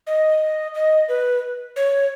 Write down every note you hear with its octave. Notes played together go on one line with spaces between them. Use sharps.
D#5
D#5
B4
C#5